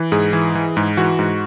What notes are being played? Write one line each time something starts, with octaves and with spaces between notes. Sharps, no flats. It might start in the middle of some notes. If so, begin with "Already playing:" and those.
Already playing: E3
G#2 G#4
E3
E3
G#2
E3 F#4
G#2